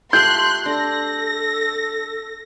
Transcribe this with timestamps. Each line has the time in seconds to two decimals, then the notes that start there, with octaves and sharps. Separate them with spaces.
0.13 A3 F4 G4 C6 F#6 G6
0.66 D4 A4 A#6